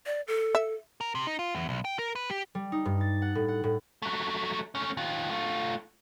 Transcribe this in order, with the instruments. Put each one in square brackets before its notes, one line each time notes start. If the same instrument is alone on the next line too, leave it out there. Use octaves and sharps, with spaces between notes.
[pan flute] D5
A4
[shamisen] E5
[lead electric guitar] A#4
C3
D#4
F4
E2
B1
G5
A#4
B4
G4
[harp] G3
D#4
G2
A6
F#5
A2
F#5
A2
[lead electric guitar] F#3 A3
A3 C#4
D#3 F4
A3 F4